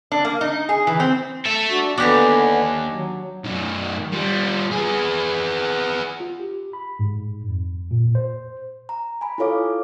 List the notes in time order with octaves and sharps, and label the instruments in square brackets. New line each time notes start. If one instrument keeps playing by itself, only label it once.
[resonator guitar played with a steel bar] D4
A#3
D#4
G#4
E3
C4
[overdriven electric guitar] A4 E5
[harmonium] D4 F#4
[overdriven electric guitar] D#2 [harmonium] D3 B3 [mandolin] D4 G4 G#5
[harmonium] F#3
[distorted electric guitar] F#2 D#3
G3 F4
B3 G#4
[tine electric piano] F4
G4
B5
G#2
F2
A#2
C5
[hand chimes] A#5
G#5 B5
E4 F4 A4 C#5 F5 D6